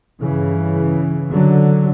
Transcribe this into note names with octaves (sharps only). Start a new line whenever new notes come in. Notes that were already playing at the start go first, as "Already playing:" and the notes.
G2 C#3 E3
D3 F#3